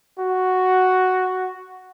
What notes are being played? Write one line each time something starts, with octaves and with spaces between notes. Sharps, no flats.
F#4